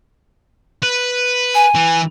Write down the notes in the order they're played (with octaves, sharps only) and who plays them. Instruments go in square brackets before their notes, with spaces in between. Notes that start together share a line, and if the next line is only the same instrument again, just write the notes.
[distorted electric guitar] B4
[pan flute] G#5
[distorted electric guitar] E3